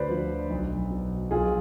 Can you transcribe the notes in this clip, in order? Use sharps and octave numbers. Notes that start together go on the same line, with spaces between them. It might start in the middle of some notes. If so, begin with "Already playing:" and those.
Already playing: D2 B4 C5 D5
D3 F3
B1
B2
B1 F4 G#4